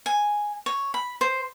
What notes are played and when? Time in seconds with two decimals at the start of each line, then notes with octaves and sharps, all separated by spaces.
0.06 G#5
0.66 C#5
0.94 B5
1.21 C5